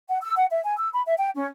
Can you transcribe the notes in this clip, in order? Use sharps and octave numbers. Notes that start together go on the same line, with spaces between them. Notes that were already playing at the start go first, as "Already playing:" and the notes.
F#5
E6
F#5
E5
G#5
E6
B5
E5
G5
C#4